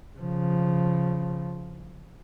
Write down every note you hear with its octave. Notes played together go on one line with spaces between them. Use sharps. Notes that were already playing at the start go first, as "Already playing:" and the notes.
C#3 F3